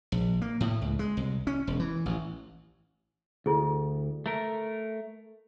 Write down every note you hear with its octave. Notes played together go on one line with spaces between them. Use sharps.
A#1
A#3
A2
C#2
G#3
C2
C#4
E1
E3
A1
D2 E4 G#4 A4
A3 A#4